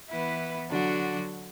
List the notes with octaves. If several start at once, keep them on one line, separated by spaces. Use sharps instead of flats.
E3 B3 E4 B4
D3 F#3 D4 F#4